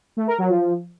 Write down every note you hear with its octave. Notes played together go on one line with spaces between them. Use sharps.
A3
A#4
F#3
F3